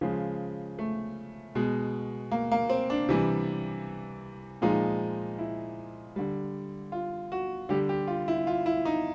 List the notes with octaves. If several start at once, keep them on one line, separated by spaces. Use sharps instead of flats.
C#3 F3 G#3
A3
B2 G#3
A#3
A#3
C4
D4
C3 E3 G3
A#2 F3 G#3 D#4
E4
D3 G3
F4
F#4
D3 G3 G4
G4
F4
E4
F4
E4
D#4